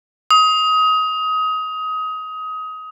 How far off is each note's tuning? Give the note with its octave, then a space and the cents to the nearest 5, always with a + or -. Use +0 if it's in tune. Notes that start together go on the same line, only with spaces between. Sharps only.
D#6 +25